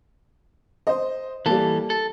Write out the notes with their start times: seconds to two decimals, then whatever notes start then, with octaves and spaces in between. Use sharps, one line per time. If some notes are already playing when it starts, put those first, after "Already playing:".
0.87 C5 D#5
1.46 E3 G3 A#3 A4
1.90 A4